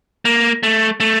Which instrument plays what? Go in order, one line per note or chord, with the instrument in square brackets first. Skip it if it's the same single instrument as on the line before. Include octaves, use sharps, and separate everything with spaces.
[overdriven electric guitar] A#3
A3
A3